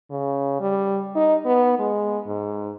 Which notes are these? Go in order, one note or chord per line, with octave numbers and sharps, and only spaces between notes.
C#3
G3
D#4
B3
G#3
G#2